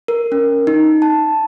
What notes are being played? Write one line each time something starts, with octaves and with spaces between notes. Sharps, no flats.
A#4
C#4
D#4
A5